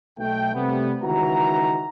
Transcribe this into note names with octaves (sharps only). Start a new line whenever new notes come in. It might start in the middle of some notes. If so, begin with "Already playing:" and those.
B1 A3 G5
C3 G3 A3 B3
C#2 D#3 E3 D#4 F#4 A#5